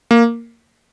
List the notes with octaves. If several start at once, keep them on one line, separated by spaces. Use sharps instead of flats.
A#3